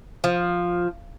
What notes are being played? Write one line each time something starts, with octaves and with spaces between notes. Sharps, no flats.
F3